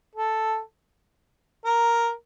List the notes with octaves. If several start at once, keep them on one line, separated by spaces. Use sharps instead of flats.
A4
A#4